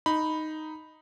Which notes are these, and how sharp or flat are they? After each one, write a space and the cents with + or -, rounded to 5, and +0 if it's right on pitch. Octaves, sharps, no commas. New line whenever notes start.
D#4 +0 B5 +0